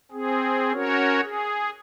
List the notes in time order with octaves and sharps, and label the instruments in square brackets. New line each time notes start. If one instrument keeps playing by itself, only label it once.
[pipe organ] C4 G#4
C#4 F#4 A#4 C#5
G#4